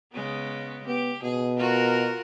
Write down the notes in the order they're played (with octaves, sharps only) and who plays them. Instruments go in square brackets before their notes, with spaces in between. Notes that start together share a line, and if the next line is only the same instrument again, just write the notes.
[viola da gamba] C#3 G#3 B3
[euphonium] B3 [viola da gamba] G4
[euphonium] B2 [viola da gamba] G#4
[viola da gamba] F4 F#4 A#4